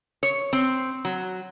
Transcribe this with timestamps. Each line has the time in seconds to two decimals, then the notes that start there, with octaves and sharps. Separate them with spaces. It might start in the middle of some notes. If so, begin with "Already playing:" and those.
0.23 C#5
0.53 C4
1.05 F#3